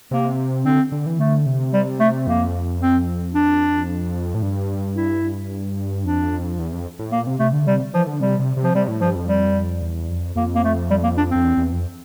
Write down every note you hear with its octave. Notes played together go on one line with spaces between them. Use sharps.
C3 A#3
D3 C4
D3
E3
D3 A3
C3
G3
A3
F2 A#3
C4
D4
A2
G2
E4
F2 D4
E2
F2
A2
A#2 A#3
C3
C3 A3
D3
C3 G3
E3 F3
D3
C3 G3
C3
C3
F3
C3 G3
A2
G2 F3
F2
G3
E2
F2
F2 A#3
A#3
A3
G3
A#3
D4
F2 C4
E2
E2
F2